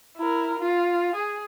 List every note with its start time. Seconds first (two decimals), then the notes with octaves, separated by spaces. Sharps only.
0.17 E4 A#4
0.59 F4
1.16 G#4